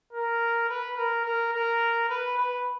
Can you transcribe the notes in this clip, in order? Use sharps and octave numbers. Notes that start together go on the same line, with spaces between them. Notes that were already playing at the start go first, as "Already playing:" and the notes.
A#4
B4
A#4
A#4
A#4
B4
B4